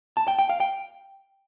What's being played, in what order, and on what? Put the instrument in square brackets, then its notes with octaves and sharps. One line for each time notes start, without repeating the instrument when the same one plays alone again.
[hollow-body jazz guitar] A5
G5
G5
F5
G5